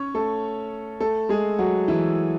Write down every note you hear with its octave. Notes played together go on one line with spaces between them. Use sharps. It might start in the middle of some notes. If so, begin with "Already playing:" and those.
Already playing: C#4 C#5
A3 A4
A3 A4
G#3 G#4
F#3 F#4
E3 E4